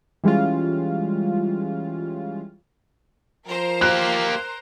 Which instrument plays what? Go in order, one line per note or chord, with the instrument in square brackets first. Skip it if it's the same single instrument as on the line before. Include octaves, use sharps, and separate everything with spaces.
[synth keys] E3 G3 G#3 C#4 F4
[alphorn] F3 [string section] A#4 C5 A#5
[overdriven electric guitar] A#3 G4 [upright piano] F#6